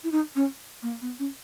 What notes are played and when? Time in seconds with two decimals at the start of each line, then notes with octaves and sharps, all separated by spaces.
0.04 E4
0.12 D#4
0.35 C#4
0.82 A#3
1.02 B3
1.19 C#4